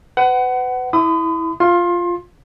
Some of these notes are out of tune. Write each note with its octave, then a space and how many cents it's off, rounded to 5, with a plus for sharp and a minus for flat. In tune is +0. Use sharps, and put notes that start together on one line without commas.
B4 +35 F#5 +20
E4 -15 B5 +45 D#6 -20
F4 +0 C6 +25